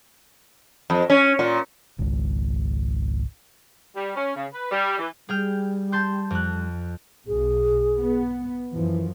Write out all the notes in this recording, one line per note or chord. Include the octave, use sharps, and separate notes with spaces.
F2
C#4
A#2
G#1 C#2
G3
C#4
C#3
B4
G3
E3
G3 G#4 G5 F6
A5 C6 G6
F2 F#6
B1 G#4
B3
F#2 E3 F3